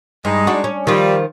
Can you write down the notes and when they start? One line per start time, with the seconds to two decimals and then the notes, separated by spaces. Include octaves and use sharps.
0.25 G2 G#3 D#4
0.47 D4 F#4
0.64 C#4
0.87 D#3 F3 G3 F4